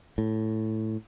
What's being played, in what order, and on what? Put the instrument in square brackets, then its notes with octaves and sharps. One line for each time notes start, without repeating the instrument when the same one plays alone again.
[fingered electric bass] A2